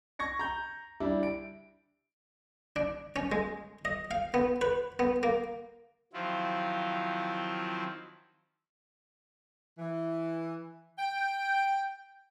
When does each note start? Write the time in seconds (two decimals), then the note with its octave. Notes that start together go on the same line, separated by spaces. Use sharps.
0.19 C#6 G#6 A#6 C#7
0.39 A#5 G6
1.00 G3 D4 E4
1.23 D7
2.76 D4
3.16 C#4
3.32 G#3
3.85 D#5
4.11 F5
4.34 B3
4.61 B4
4.99 B3
5.23 A#3
6.13 D#3 F3 F#3 C4 E4 F4
9.78 E3
10.98 G5